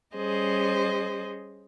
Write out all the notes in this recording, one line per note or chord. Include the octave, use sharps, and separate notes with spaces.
G3 C#4 G#4 C5 D#5